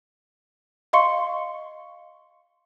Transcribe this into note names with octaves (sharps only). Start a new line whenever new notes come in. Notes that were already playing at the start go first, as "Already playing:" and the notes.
D#5 F5 C6 C#6 C#7